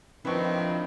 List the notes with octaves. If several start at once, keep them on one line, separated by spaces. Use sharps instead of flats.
D#3 F3 C4 D4 E4 B4 C#6